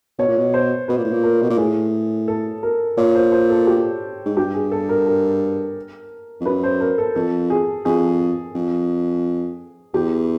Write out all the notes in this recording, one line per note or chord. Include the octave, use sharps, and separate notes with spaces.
B2 C#5
A#2
B2
C5
B2 B4
A#2
A2
A#2
A#4
B2
A#2
A2 G#4
A4
A#4
A#2 C#5
C5
C5
A4
G4
G#2
G2 G4
G#4
A4
A#4
A#4
F2
F#2 B4
C5
A#4
A4
F2 A4
G#4
F2 G#4
F2
E2 G4